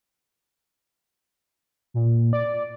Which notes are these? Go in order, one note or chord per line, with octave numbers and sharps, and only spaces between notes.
A#2
D5